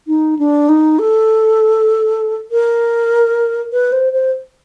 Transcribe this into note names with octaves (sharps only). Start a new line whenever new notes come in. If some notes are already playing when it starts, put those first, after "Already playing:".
D#4
D4
D#4
A4
A#4
B4
C5
C5